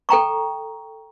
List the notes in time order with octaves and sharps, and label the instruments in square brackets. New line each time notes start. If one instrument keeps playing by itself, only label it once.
[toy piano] A4 G5 A#5 C#6